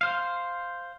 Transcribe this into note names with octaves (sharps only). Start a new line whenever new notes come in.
C5 F5